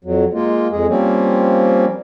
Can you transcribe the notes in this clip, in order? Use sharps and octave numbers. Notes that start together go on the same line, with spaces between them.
F2 F#3
G#3 A#3 F4
F2 G#3 G#4
F3 G3 A#3 C4 C#4